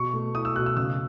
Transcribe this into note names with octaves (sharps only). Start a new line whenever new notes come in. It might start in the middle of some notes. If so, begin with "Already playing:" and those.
Already playing: B2 C#6
A3
E4 D#6
E6
B2 F#6
E6
C#3 E6